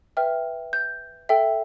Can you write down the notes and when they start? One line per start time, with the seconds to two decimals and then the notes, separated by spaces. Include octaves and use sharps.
0.17 B4 E5 G5 F6
0.73 G6
1.29 A4 E5 G5